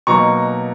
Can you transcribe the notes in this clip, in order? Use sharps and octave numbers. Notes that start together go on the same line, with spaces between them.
B2 F#3 A#3 D#4 A#5 C#6